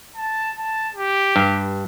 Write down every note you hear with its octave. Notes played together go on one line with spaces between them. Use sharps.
A5
A5
G4
G2